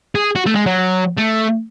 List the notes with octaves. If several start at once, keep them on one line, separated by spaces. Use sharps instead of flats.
G#4
F#4
A3
G#3
F#3
A3